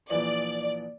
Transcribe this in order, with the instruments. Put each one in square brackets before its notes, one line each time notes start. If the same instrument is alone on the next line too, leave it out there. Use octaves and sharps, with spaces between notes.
[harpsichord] A#1 E3 [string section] D5